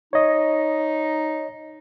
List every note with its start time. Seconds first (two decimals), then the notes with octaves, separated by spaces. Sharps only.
0.13 D#4 C#5 D#5